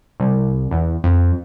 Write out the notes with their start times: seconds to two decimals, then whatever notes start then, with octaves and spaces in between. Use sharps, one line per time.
0.20 C2
0.71 E2
1.04 F2